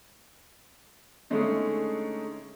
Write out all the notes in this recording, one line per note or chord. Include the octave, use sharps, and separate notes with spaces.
D3 G#3 A3 C#4 D#4